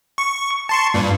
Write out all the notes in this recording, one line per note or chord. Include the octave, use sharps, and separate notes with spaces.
C#6
A5 C6 C#6
G2 A#2